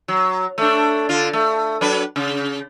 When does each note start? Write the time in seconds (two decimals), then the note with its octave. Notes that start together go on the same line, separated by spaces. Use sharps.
0.08 F#3
0.58 A3 D4
1.09 D3 F4
1.33 A3
1.81 F#3 D4 B4
2.16 C#3